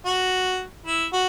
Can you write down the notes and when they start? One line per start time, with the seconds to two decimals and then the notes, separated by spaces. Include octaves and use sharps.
0.06 F#4
0.86 E4
1.13 F#4